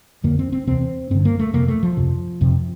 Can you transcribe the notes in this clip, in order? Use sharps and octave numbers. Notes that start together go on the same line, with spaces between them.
F2 D3 A#3
C4
C4
E2 C3 C4
G2 D3 C4
A#3
A3
F2 C3 A#3
A3
F3
F2 C3
F2 C3